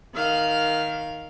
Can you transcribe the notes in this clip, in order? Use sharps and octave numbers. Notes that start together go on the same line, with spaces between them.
D#3 F5